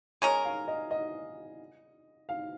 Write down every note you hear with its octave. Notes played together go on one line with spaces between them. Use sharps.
G#3 C#4 A#4 G#5
F5
D#5
D#5
F5